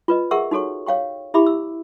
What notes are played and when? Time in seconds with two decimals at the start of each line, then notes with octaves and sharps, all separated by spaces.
0.08 F4 B4 D#5
0.31 G#4 A#4 E5 F#5 C#6 E6
0.51 D#4 F#4 A4 C#5 C#6
0.86 C#5 F5 G5 C#6
1.34 E4 G4 E5 B5 D6
1.47 E6